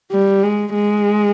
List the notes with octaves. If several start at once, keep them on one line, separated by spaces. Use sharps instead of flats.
G3
G#3
G#3